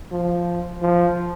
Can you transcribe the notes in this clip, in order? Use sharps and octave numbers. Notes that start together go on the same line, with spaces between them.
F3
F3